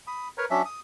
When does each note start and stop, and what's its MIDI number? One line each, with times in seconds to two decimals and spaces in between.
0.07 0.28 83
0.07 0.28 87
0.38 0.46 70
0.38 0.46 71
0.38 0.46 73
0.38 0.46 82
0.50 0.62 54
0.50 0.62 61
0.50 0.62 62
0.50 0.62 76
0.65 0.80 87